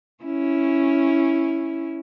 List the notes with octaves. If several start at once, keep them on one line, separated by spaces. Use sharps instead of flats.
C#4 E4